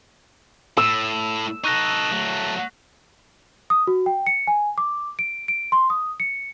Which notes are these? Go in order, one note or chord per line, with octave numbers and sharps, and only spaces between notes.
A2 E6
D#4 A4 C#6 F#6 A#6
F#3 A3
D#6
F#4
G5
C#7
G#5
D6
D7
D7
C6
D#6
C#7